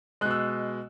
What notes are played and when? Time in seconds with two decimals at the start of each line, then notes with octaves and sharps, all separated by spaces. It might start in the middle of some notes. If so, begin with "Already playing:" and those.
0.21 G#3 F#6
0.25 B2
0.31 E6